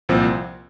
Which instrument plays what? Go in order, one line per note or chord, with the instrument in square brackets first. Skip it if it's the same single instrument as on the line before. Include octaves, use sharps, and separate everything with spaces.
[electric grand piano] C2 A#2 F3 C4